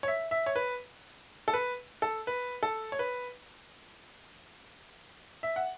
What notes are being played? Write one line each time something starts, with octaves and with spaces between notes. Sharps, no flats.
C#5
E5
E5
C#5
B4
A4
B4
A4
B4
A4
C#5
B4
E5
F#5